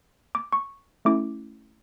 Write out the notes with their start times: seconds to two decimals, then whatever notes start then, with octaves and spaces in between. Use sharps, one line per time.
0.35 D6
0.53 C#6
1.05 A3 C#4 E4 D6